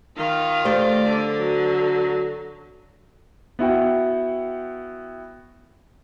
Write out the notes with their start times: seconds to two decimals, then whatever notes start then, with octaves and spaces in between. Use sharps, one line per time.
0.17 D#3 F4
0.65 A3 G4 C5 D5
1.05 D3
1.37 F#3
3.59 B3 E4 F#4 G5